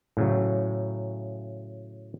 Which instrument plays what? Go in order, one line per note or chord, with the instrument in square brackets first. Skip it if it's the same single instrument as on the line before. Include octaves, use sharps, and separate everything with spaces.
[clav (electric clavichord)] A2 C#3 F#3